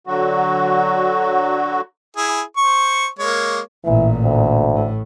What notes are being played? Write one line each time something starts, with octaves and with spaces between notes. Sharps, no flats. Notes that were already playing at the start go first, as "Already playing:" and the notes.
D3 F#3 F#4
E4 G#4
C5 C#6
G#3 A#3 C#5
A1 A#2 E3
D2
A2